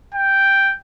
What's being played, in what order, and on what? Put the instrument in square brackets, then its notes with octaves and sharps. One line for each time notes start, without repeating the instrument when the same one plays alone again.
[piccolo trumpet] G5